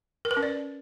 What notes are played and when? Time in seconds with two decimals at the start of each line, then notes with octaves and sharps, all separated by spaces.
0.25 A#4
0.31 B4
0.37 C#4
0.43 D5